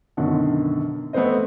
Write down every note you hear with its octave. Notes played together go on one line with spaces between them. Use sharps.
F#2 B2 D3 D#3
A3 B3 C4 C5 D#5